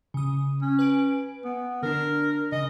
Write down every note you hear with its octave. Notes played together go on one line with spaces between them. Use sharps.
C#3 D#6
C#4
B4 G#5 D7
B3
D3 D4 A#4
C#3 D#5